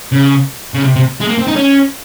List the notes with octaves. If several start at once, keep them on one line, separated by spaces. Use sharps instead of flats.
C#3
C#3
C3
C3
G#3
A#3
C4
D#4
C#4